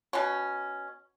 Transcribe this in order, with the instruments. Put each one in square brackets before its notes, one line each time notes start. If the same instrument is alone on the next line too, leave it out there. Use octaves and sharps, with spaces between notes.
[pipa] B2 C#4